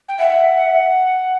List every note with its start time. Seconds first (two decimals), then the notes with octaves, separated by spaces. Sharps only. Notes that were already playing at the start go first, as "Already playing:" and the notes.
0.09 G5
0.19 E5 F#5